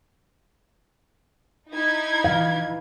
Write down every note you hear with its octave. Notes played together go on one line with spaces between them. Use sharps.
D#4 E4 G#6
E3 F5